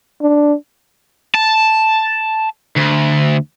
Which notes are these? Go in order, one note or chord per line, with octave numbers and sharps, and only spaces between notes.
D4
A5
D2